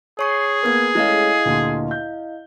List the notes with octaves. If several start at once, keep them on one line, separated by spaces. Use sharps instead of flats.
G#4 C#5 C#6 C7
A#3 B3 A#4 B4 G#6
G#3 A3 C#4 E4 D#5 F5
D2 A#2
G6